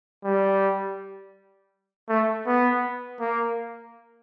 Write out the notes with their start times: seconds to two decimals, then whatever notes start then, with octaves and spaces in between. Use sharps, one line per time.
0.24 G3
2.09 A3
2.47 B3
3.20 A#3